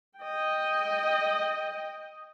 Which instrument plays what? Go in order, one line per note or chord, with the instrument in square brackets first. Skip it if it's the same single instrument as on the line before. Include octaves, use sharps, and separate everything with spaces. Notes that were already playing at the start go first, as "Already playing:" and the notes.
[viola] D#5 G5